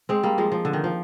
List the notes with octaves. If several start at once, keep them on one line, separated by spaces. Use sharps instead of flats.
G#3 C4
G3 A#3
F3 G#3
F3
D3
D#3
F3